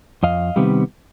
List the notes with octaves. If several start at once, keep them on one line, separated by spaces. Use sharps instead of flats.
F2 D#5 F5
C3 D#3 G3 B3